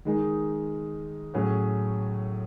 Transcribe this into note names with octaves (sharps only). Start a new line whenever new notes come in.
D#3 G#3 D#4 G#4
A2 F#3 C#4 G#4 C#5